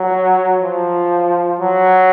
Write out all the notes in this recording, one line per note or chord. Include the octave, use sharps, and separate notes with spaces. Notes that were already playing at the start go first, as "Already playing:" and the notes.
Already playing: F#3
F3
F#3